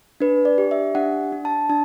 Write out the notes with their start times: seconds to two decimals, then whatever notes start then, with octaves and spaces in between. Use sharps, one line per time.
0.20 D4 B4
0.45 D5
0.58 G4
0.71 E5
0.95 D4 F#5
1.32 D4
1.45 A5
1.70 D4 A5